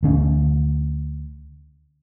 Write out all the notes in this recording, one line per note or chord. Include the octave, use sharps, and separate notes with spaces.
D2 D3 C#4